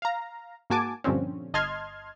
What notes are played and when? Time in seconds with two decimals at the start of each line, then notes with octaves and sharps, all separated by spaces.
0.02 F5 A#5
0.70 G#2 A#3 F#4 G#5 A5 D6
1.04 G2 A#2 D3 F3 C4 C#4
1.54 G1 D#5 A5 C6 F6 G#6